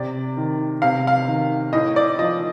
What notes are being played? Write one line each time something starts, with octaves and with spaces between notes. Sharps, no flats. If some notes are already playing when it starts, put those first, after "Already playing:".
Already playing: C3 D5
D#3
C3 F5
F5
D#3
A2 D#5
D5
F3 D#5